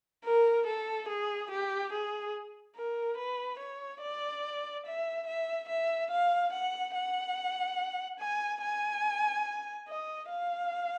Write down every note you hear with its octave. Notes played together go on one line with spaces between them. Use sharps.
A#4
A4
G#4
G4
G#4
A#4
B4
C#5
D5
E5
E5
E5
F5
F#5
F#5
G#5
G#5
D#5
F5